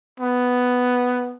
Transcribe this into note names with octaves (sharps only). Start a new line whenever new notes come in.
B3